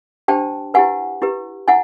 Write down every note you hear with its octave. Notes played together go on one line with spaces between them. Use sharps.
D4 G4 C5 G5 A5
E4 G4 B4 F#5 G#5
E4 G4 B4
E4 F#5 G#5